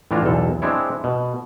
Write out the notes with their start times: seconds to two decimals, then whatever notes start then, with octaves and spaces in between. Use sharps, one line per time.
0.11 A2 E3 A3 D4 F4 A#5
0.23 B1 E2 A4
0.62 G#3 C4 D4 E4 C#5
1.04 B2